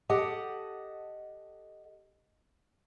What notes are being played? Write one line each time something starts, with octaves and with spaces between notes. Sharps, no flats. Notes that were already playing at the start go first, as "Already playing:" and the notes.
G4 A4 D#5 F#5 A5